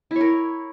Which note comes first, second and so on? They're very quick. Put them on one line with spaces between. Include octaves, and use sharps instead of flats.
E4 C#5 A#4